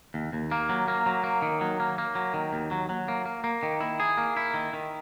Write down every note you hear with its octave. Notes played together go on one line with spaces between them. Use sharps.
D#2
D#2
A#3
F#3
A#3
F#3
A#3
D#3
F#3
A#3
A#3
F#3
D#3
D#2
F#3
F#3
A#3
A#3
A#3
D#3
E4
G#4
A#3
E4
D#3
D#3